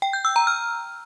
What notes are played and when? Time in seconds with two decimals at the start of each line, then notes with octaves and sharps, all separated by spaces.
0.02 G5
0.13 G6
0.25 E6
0.36 A#5
0.47 F6